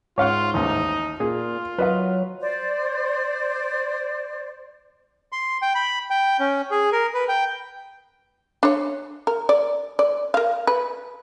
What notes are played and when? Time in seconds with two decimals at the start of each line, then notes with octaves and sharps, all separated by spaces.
0.18 G#2 F4 C#5 F5 F#5
0.54 A1 D#2 D#4
1.20 A#2 F4 G#4
1.78 F#3 B4 D#5 F5
2.41 C5 D5
5.32 C6
5.62 G5
5.75 B5
6.10 G5
6.40 C#4
6.71 G#4
6.92 A#4
7.14 B4
7.29 G5
8.63 D4 C#5
9.27 A#4
9.49 D5
9.99 D5
10.34 A#4 F5
10.67 B4